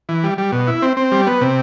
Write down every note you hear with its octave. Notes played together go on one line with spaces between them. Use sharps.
E3
G3
G3
B2
E4
C4
C4
G3
B3
C3